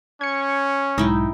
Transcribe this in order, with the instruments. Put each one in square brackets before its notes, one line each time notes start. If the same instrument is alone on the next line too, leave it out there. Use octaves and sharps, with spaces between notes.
[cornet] C#4 [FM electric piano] G#6 C#7
[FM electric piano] B1 G#2 [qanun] D#4 E4 G5